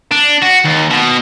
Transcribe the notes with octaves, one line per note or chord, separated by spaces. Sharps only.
D4
F#4
D#2
B2